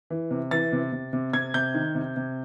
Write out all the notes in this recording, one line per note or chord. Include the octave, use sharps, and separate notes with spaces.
E3
C3
E3 A6
C3
C3
C3
C3 G#6
C3 G6
D#3
C3
C3